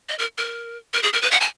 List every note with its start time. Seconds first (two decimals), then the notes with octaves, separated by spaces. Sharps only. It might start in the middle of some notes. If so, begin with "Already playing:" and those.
0.09 D#5
0.19 A#4
0.38 A#4
0.93 A#4
1.03 G#4
1.13 A#4
1.22 B4
1.31 F#5
1.41 G#5